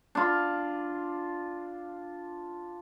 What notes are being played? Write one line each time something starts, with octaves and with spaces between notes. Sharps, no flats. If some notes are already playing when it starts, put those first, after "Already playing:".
D4 F4